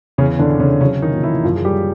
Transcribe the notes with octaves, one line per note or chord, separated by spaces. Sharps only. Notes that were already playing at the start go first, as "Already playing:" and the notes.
E2 C#3 C#4
D3 D4
C3
C#3 C#4
C#3 F#3 C#4
D#3 D#4
A#2
E3 E4
F#2 F3 F4
G#4
G3 G4